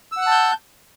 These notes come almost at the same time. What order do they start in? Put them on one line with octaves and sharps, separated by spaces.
E6 F#5 F#6 A5 G6